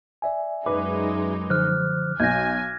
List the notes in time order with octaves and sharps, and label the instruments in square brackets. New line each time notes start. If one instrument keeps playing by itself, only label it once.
[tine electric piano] D5 E5 G#5
[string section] F#2 G#3 D#4 [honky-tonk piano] B4 [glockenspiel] D6
[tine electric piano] D3 F3 C5 [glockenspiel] F6 F#6
[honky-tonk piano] B1 [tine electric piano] D#5 G6 [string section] G#5 [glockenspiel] G#6 A#6